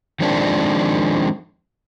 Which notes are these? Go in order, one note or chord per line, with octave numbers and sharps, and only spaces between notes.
D#3 F3 G#3 C4 D4